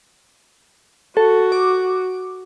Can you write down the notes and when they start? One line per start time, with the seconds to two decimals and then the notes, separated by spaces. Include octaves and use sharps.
1.17 F#4 A4
1.52 D6